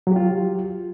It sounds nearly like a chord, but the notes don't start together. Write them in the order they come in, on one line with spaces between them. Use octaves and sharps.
F#3 G4 F4